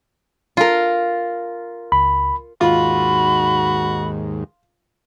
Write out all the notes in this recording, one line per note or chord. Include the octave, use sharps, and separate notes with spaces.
F4 A#4
C#2 B5
D#2 G#2 F4 F#4 B5